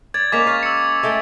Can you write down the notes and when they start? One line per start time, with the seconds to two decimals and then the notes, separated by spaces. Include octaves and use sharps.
0.14 D5 G#6 A6
0.32 G#3 A#3 C#4 D6 B6 F7
0.47 F5 C#6
0.63 E6 C#7
1.03 G#3 A3 G5